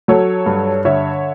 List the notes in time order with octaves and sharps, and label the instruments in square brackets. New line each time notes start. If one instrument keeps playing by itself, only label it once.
[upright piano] F#3 A4 C#5
G2
D3 C#5 E5